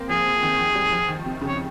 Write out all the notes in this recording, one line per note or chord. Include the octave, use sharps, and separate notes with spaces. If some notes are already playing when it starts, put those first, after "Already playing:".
Already playing: A#3 C4
F3 G#4
C3
D#3
F3
G3
F3
D#3
C3
C#3
C#5